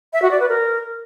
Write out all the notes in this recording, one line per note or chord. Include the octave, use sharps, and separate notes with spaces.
E5
F#4
D5
B4
A#4